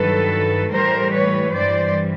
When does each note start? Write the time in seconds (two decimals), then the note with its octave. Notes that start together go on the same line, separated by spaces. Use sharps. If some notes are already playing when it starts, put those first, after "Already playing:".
Already playing: G2 D#3 F#3 A4 B4
0.71 A2 E3 G3 A#4 C5
1.12 B4 C#5
1.53 G2 E3 G3 C5 D5